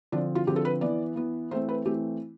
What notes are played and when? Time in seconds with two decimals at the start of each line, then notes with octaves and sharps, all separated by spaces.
0.12 D3 F3 C4 D4
0.35 F4
0.47 D3 F3 C4 G4
0.56 A4
0.65 B4
0.81 E3 B3 D5
1.16 E3 B3
1.51 E3 A3 C4 C5
1.69 B4
1.85 E3 A3 C4 G4